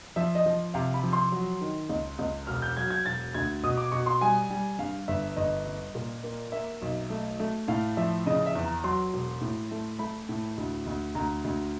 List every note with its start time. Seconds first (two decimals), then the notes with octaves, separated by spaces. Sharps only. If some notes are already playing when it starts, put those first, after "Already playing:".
0.16 F3 E5
0.35 D#5
0.46 F3
0.74 C3 F5
0.94 B5
1.03 F3
1.13 C6
1.32 F#3
1.61 D#3
1.89 C#2
2.19 C#2
2.47 E1 F6
2.62 G6
2.77 F#3 G#6
2.90 G#6
3.06 E1 A6
3.34 D2 G#6
3.64 B2 D#6
3.77 D6
3.92 B2 C#6
4.06 C6
4.21 G3 G#5
4.50 G3
4.79 G2 F5
5.08 G1 E5
5.36 G1 D#5
5.66 G2
5.95 A#2
6.24 A#3
6.52 A#3 E5
6.82 B1
7.10 A3
7.40 A3
7.68 A2 F5
7.97 F3 E5
8.26 C#3 D#5
8.46 E5
8.55 E2
8.64 A#5
8.84 F#3 C6
9.13 E1
9.41 A2
9.71 A3
9.99 A3 B5
10.29 A2
10.57 D2
10.86 D2
11.15 D2 A#5
11.44 D2